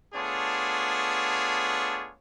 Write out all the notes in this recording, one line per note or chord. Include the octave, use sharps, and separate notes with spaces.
A3 B3 D4 F4 G#4 C#5